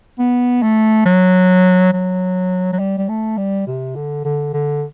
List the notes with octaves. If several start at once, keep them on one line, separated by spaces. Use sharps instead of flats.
B3
A3
F#3
F#3
F#3
G3
G3
A3
G3
C3
D3
D3
D3